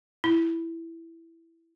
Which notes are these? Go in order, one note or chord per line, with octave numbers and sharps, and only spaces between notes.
E4